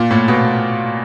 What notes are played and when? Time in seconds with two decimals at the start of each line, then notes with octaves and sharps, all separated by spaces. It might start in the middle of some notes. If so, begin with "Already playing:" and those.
Already playing: A#2
0.11 A2
0.28 B2